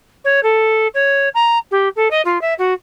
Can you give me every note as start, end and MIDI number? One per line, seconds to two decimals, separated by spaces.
0.25 0.43 73
0.43 0.88 69
0.94 1.29 73
1.35 1.58 82
1.71 1.89 67
1.96 2.08 69
2.11 2.21 75
2.25 2.41 65
2.41 2.54 76
2.59 2.74 66